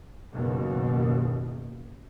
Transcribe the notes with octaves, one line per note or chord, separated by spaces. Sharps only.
F#1 D#2 B2